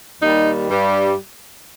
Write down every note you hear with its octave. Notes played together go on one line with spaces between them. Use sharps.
D#2 D#3 G3 D#4
G2 G3